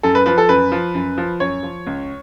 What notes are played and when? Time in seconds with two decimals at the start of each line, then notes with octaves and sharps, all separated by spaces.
0.03 F#2 A4
0.15 B4
0.26 F3 B4
0.38 A4
0.49 F#2 B4
0.72 F3
0.95 F#2
1.18 F3
1.40 F#2 C#5
1.63 F3
1.87 C#2